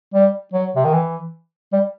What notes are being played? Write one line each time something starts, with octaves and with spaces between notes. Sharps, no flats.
G3
F#3
C3
D#3
E3
G3